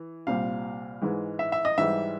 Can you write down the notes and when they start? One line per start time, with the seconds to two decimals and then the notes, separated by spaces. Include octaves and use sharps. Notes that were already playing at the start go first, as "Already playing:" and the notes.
Already playing: E3
0.27 C2 A#2 G3 C4 F5
1.02 G#2 E3 G#3
1.39 E5
1.52 E5
1.65 D#5
1.78 G#2 E3 G3 E5